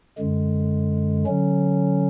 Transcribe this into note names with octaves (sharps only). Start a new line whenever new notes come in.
F#2 D3 G#3
D3 F#3 C#4